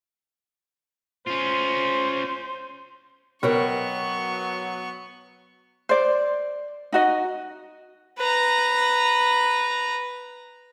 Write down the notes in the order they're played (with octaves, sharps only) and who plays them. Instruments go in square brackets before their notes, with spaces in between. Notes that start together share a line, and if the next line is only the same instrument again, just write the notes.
[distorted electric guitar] C#4 F4 [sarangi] C5
[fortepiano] B2 [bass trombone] F#3 [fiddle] B3 C#6 [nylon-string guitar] A#4 C#5 G5
[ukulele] C5 D5
D#4 F#4 D#5
[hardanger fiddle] B4 A#5